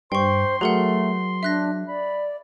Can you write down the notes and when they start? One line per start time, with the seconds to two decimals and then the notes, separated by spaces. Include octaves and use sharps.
0.12 G2 C5 G5 C6 C#6
0.61 F#3 A3 G#4 A#4 F#5
1.43 D4 E5 F#6 A#6
1.88 D5 B5